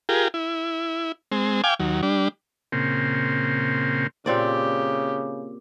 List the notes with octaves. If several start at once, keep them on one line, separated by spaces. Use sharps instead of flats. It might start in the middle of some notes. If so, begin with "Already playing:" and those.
F4 G4 G#4 A#4
E4
G#3 C4
F5 G5 G#5 D6
D#2 F#3
G3 D4
A#2 C#3 C4
A#2 C#3 C4 G4 D5